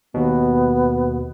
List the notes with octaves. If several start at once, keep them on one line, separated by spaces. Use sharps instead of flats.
D#2 B2 B3